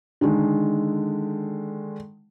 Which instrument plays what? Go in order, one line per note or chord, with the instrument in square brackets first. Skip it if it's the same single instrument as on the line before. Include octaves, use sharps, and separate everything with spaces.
[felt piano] D3 D#3 G#3